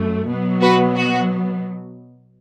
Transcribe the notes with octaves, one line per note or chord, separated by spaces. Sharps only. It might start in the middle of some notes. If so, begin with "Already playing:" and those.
Already playing: F#2 A3
B2 F#3 B3
F#4 B4
F#4